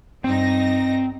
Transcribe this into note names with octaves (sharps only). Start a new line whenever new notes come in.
G2 C4 D#4 A#6